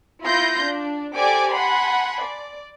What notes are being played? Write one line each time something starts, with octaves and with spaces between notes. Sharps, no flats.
E4 F4 C6 G6 A#6
D4
G4 A4 C5 D5 G#5 D6
F#5 G#5 A5 B5 C6
D5